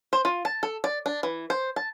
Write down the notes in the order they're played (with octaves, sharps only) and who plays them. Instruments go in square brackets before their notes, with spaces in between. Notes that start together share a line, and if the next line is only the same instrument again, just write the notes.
[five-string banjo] C5
F4
A5
A4
D5
D4
E3
C5
A5